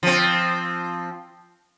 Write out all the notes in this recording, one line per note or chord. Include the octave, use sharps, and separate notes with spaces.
F3 C4